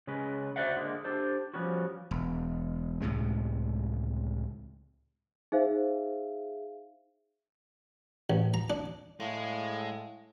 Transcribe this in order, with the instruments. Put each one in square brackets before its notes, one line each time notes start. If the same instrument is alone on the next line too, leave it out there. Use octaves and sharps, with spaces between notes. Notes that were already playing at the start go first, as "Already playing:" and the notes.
[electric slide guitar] C#3 G#3 C#4 B4
F#4 C5 D5 E5 F#5
D3 G#3 A#3
D4 G4 A4 C5
F3 G3 B3 C#4 F#4
[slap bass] E1
C#2 A2 C3 G#3
[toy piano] D#4 C5 [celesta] G#4 E5 F5
[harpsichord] A1
A#5
D4
[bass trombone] A2 [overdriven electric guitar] G#3 [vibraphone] F5